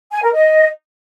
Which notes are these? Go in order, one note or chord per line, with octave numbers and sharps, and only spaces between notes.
G#5
A#4
D#5